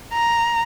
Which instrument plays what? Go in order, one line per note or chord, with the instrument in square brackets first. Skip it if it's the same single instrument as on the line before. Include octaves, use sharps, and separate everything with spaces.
[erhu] A#5